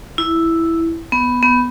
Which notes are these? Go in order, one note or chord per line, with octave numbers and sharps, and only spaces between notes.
E4
B3
B3